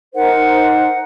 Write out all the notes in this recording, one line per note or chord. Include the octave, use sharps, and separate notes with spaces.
D#4 A#4 C5 F#5